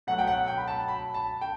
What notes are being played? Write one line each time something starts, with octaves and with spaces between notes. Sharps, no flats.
B2 F#3 A3 F#5
G5
F#5
G5
B5
A5
B5
A5
G5